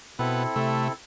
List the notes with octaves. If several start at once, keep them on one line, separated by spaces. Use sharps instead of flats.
B2 B3 C4 E4 A4
C3 A3